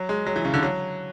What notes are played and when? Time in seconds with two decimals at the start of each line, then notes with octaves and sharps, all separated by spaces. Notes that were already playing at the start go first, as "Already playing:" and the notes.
Already playing: F#3
0.09 G#3
0.26 F#3
0.36 E3
0.45 C#3
0.54 D3
0.63 F#3